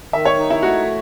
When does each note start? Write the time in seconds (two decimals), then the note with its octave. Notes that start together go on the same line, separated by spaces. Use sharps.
0.13 D#3 E5
0.25 C#5
0.38 D#4
0.50 E4
0.62 A3 F#4